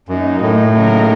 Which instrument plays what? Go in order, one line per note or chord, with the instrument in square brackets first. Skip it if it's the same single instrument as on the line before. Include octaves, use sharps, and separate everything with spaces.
[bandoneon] F#2 [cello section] F#3 A#3 D#4
[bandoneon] A2
[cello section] C#3 F#3 A#3 D#4 A#4